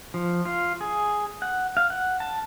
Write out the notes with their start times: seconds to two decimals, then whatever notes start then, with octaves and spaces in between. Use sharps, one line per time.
0.14 F3
0.45 F4
0.81 G#4
1.42 F#5
1.77 F5
1.90 F#5
2.20 A5